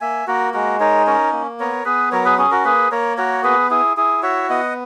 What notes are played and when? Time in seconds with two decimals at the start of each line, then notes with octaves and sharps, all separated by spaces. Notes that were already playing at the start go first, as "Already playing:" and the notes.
0.01 A#3 E5 G#5
0.27 A#3 F#4 A#4
0.54 G#3 F#4 A#4
0.80 D#4 A#4 C#5
1.06 C#4 A#4 C#5
1.32 A#3
1.60 B3 A#4 C#5
1.85 B3 G#4 B4
2.12 F#3 A#4 C#5
2.25 G#4 B4
2.38 C#4 G#4
2.51 F#4 A#4
2.64 A#3 G#4 B4
2.91 A#3 A#4 C#5
3.17 F#4 A#4 C#5
3.43 B3 G#4 B4
3.71 E4 G#4
3.97 E4 G#4
4.23 F#4 C#5 E5
4.50 B3 D#5 F#5